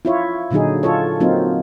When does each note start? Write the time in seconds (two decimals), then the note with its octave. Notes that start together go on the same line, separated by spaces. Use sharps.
0.05 E4 F4 C#5
0.51 A#2 D3 F#3 D#4 G#4
0.83 F4 A4 C#5
1.20 F#3 A#3 C4 D#4 F4